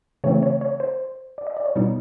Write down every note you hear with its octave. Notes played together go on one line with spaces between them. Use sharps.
C#3 E3 A3 C4 C#5
C#5
C#5
C5
D5
D#5
D5
C#5
B2 G3 B3 D#4